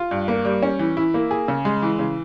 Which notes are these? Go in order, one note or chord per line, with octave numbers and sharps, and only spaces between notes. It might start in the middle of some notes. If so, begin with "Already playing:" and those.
Already playing: F4
G2
A#3
G3
C#4
E3
E4
A#3
G#4
C#3
G#3
E3
C#3